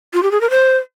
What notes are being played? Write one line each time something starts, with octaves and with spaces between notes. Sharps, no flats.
F4
G4
G#4
A#4
C5